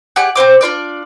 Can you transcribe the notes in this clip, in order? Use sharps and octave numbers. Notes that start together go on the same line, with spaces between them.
G4 G#4 D5 F#5
C4 F4 C5 D6
D4 F4 B4 D5